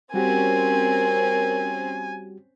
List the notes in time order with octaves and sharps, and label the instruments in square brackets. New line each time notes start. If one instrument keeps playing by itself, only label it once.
[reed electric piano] G3 F#4 G4 [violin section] C4 C#4 [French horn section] A#4 [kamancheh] G#5